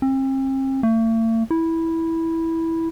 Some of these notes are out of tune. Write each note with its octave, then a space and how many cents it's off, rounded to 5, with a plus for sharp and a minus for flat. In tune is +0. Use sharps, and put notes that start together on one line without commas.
C4 +40
A3 +45
E4 -10